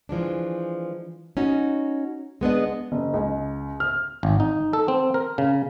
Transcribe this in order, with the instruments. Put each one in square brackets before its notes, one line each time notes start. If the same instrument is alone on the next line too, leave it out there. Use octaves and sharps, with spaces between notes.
[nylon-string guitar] E3 F3 G#3 D4
C#4 D#4 F#4
G#3 B3 D4 D#5
[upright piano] F#1
C#2
F6
[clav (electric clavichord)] G#1
D#4
A4
C4
A#4
C#3